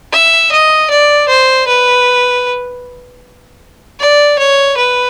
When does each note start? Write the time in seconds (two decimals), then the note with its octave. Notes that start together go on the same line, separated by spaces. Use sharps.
0.12 E5
0.52 D#5
0.90 D5
1.29 C5
1.67 B4
3.99 D5
4.39 C#5
4.77 B4